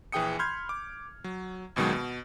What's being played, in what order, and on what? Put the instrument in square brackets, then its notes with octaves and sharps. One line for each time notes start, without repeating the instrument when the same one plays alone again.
[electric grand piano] A#1 E3 G#4 G5 D#6 C#7
B5 C6 F6 G6 G#6
D6
F#3
G#1 C#2 B2 D#3 F#3 G#3
B2